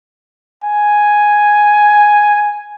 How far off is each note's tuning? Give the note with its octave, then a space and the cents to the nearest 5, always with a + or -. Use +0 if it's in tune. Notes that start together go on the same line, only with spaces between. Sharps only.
G#5 +5